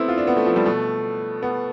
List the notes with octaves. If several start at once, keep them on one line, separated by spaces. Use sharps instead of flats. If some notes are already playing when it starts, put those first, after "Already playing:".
Already playing: A3 B3 C4 E4
F4
D4
B3
A3
F3
G3
B2 A3
B3